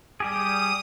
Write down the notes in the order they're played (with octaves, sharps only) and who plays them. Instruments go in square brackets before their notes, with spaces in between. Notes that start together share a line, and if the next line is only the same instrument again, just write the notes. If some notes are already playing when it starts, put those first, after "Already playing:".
[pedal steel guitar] G3 G4 G#4 [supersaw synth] D#6